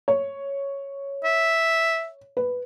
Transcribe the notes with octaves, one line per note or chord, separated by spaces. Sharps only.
C#5
E5
B4